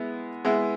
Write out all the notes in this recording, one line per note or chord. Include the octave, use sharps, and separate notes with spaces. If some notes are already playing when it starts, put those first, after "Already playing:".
Already playing: G#3 B3 E4
G#3 B3 E4